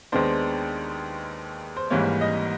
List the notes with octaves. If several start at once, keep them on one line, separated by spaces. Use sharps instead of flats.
D#2 D#3 G#3 B3 D4 C5
C5
G#1 G#2 E3 G3 A#3 C#5
D#5